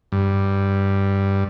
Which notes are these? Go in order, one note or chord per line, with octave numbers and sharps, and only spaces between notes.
G2